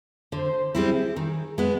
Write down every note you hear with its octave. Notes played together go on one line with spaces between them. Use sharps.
D3 C5
G3 C4 E4 G#4
D#3 G#4
G#3 B3